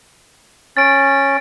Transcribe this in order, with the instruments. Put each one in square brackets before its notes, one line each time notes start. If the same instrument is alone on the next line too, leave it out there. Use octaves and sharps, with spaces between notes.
[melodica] C#4 [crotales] A6 D7